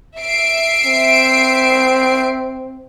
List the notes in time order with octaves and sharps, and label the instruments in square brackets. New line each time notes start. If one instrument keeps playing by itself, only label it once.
[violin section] E5 C7 D7
[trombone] C4